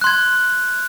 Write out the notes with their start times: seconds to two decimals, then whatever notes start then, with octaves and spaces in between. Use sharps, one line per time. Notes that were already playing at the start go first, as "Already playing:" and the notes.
0.01 F#6
0.04 C6
0.07 G#6